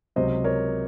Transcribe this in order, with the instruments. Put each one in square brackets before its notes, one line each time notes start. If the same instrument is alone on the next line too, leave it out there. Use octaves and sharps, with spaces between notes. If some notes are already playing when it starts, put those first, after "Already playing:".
[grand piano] C#2 C3 F#3 C5 D#5
A#4 C#5